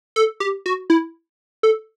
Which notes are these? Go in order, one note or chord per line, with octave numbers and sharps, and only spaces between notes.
A4
G4
F#4
E4
A4